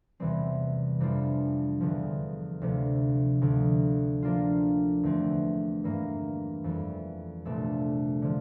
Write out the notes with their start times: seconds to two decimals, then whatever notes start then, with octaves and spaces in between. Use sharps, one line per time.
0.20 E2 C3 E3 G3 C4
1.00 F2 E3 G3 D4 F4
1.81 E2 D3 F3
2.61 D2 C3 F3
3.41 D2 D3 F3
4.22 F3 A#3 D4 F4
5.03 E2 D3 A3 C4
5.84 G2 E3 A#3
6.64 F2 E3 G3
7.45 C2 A#2 A3 D4 A4
8.22 D3 F3